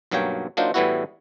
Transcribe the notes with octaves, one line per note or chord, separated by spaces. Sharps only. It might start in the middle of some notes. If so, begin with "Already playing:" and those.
B1 G2 F#3 A#3 C#5 G5
F#3 A#3 D4 D#4 F4 C5
A2 E3 G3 B3 E4 F#4